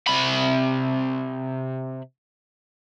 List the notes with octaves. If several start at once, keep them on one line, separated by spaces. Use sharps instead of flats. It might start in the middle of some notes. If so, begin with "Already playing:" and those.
C3 B5